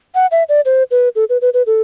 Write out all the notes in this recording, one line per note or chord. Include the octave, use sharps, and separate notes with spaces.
F#5
E5
D5
C5
B4
A4
B4
B4
B4
A4